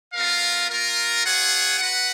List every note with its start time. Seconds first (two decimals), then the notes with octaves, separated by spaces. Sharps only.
0.14 B3 F4 A#4 F5
0.69 A#3 F4 A#4
1.24 F4 G#4 C#5 F#5
1.78 F#4 B4 F#5